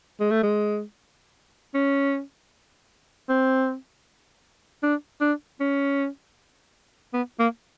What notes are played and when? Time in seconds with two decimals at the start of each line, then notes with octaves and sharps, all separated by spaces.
0.20 G#3
0.31 A3
0.43 G#3
1.74 C#4
3.29 C4
4.83 D4
5.21 D4
5.60 C#4
7.14 B3
7.39 A#3